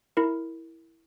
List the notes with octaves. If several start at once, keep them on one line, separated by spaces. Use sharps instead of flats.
E4 A#4